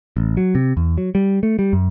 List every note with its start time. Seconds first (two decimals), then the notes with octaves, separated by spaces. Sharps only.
0.17 A1
0.37 F#3
0.55 C3
0.77 E2
0.98 F#3
1.15 G3
1.43 A3
1.59 G3
1.73 F#2